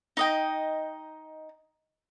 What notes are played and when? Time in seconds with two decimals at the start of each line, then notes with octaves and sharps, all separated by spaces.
0.17 D#4 D#5 G5